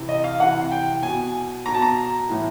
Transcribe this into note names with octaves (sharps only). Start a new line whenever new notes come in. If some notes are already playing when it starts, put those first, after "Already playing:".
Already playing: C3 E3
D#5
F5
C3 E3 F#5
G5
B2 G#5
B2 A#5
A5
A#5
A2 E3